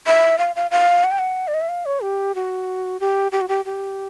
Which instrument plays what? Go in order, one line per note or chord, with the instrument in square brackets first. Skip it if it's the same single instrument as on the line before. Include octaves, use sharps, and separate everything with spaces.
[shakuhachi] E5
F5
F5
F5
F#5
G5
F#5
D5
D#5
E5
F5
C#5
G4
F#4
G4
G4
F#4
G4
G4